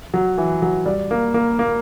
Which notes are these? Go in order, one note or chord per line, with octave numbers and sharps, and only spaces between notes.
F#3
E3
F#3
G3
A#3
A#3
A#3